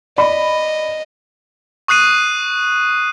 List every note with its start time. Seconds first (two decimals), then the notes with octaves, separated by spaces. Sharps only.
0.18 D5 D#5 B5
1.88 C#6 D#6 F#6 C7 D#7